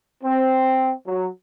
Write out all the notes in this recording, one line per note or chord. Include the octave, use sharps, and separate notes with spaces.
C4
F#3